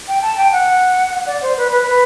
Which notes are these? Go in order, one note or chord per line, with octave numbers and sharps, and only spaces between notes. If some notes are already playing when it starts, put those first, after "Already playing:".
G5
A5
G5
F#5
D5
C5
B4
B4
B4